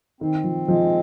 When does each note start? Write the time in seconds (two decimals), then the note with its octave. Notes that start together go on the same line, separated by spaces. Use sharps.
0.21 D#3 C4
0.44 F3
0.68 F3 G#3